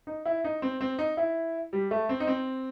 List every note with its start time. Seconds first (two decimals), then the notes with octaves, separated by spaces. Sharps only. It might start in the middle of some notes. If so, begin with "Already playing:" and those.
0.07 D#4
0.26 E4
0.44 D#4
0.62 C4
0.81 C4
0.99 D#4
1.17 E4
1.73 G3
1.91 A3
2.09 C4
2.20 D#4
2.27 C4